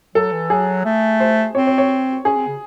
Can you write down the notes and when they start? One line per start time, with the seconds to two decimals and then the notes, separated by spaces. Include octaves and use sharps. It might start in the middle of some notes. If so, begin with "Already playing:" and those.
0.15 F#3 A4
0.33 E3
0.50 F#3 G#4
0.85 A3
1.20 C5
1.55 C4 C#5
1.67 C#5
1.78 C#5
2.25 C#4 G#4
2.36 C4
2.48 C#3